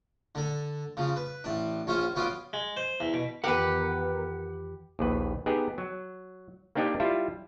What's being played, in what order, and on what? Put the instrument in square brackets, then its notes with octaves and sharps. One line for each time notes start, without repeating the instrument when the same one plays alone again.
[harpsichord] D3 A4
C#3 F3
B4
A1 D4
A#1 C#4 F4 C5 C#6
B1 B3 C#4 F4 C6 D6
G#3
C5
E2
B2
[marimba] F2 D#3 E3 [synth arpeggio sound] B3 A#4 [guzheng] G4 B4 [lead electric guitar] F#5
[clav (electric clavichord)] A#1 D#2 B4
B3 D#4 G4 G#4
F#3
A#3 C4 D4 D#4 G4 D#5
G3 E4 F4 A5